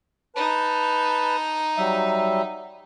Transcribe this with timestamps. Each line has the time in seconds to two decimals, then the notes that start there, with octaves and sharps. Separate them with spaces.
0.36 D#4 B4 A5
1.77 F#3 G3 E5